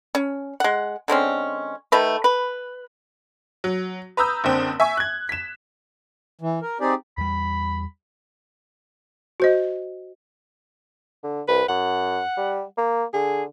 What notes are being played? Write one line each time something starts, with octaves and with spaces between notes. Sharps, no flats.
C#4
G#3 F#5
D3 G#3 C4 C#4
D#3 A3 B4
B4
F#3
B4 A#5 D#6 E6 G6
F#1 D3 C4
E5 G#5 C#6
F#6 G#6
B6 E7
E3
A#4
C4 D#4 G4 G#4 D5
E2 G3 B5
F#4 C5 D#5
D3
C2 B4
F#2 F#5
G3
A#3
D3 G#4